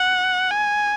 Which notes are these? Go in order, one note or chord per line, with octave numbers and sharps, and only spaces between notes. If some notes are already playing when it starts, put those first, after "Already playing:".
Already playing: F#5
G#5